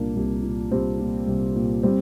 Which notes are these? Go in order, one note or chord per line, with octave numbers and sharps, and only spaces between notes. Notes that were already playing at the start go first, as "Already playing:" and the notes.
Already playing: C2 A#2 A#3 D4
C2
A#2
C2 G3 C4
A#2
C2
A#2
G3 C4